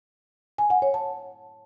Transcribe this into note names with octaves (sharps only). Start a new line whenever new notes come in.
G#5
F#5
C#5
A5